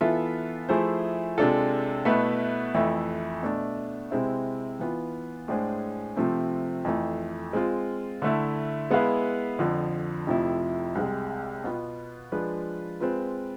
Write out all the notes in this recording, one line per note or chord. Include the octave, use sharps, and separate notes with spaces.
E3 B3 F4 A4 E5
F3 A3 E4 G#4 C5
C3 G#3 D4 F4 A4
B2 A3 E4 B4 E5
F2 E3 A3 E4
B2 A3 D4
C3 G#3 C4 E4
E3 B3 F4
A2 G#3 D4 G#4 C5
C3 F3 A3 C4
F2 E3 A3
G#3 C4 F4
D3 A3 E4
G#3 B3 E4 B4 F5
F2 D3 F3
F2 C3 F3 A3 E4
C2 C3 G#3
B2 B3 F4
F3 G#3 D4 F4 B4
G#3 C4 F4 B4